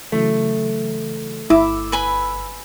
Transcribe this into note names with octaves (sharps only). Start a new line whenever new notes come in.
C#3 E3 F#3 A3
G1 E4 D6 E6
B4 G#5 B5